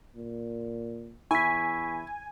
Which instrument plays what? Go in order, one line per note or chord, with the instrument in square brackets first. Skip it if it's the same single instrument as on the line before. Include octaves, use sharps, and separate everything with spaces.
[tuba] A#2
[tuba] E2 [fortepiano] E4 [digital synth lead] G#5 [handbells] C#6 B6